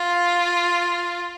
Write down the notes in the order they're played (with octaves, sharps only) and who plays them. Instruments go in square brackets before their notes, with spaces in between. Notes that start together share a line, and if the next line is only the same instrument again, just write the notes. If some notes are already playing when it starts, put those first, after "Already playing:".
Already playing: [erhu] F4